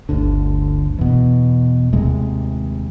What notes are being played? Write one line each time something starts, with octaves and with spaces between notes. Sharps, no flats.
G1 D2 D3
E2 B2
D#2 A2 C3 G#3